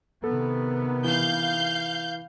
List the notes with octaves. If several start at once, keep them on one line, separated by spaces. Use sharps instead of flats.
C3 D#3 B3 A4
E3 F5 G6